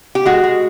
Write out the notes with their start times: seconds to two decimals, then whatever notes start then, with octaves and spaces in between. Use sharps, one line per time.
0.15 G4
0.25 G#3 F#4
0.44 G#3